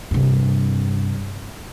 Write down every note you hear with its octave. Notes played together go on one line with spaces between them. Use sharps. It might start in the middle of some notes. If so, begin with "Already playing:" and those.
G2 C3